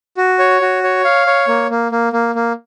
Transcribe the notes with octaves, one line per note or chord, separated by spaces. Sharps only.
F#4
C#5
F#4
C#5
F5
C#5
A#3
A#3
A#3
A#3
A#3